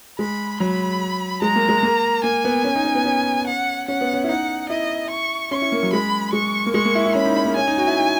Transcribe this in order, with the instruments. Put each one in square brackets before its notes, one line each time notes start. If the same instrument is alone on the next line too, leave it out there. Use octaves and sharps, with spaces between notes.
[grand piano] G#3 [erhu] B5
[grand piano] F#3 [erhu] B5
[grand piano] G#3 [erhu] A#5
[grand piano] A#3
G#3
A#3
[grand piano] A#3 [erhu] G#5
[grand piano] B3
C#4
D#4
C#4
B3
C#4
[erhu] F#5
[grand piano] C#4 [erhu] F#5
[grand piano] B3
C#4
E4
[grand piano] D#4 [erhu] F#5
[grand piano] E4 [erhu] D#5
[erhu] C#6
[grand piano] C#4 [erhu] C#6
[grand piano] E4
A#3
F#3
[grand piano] G#3 [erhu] B5
[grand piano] G#3 [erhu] C#6
[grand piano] A#3
[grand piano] G#3 [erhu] C#6
[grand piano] A#3
E4
E4
[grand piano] C#4 [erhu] B5
[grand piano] D#4
C#4
A#3
[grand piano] C#4 [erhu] G#5
[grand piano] D#4
F#4
E4
D#4